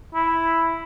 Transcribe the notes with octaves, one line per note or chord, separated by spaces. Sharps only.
E4